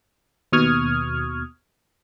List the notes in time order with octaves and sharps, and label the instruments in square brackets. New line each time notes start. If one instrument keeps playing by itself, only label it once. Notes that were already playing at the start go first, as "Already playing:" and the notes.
[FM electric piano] D#2 B2 C#6 D#6 F6 G#6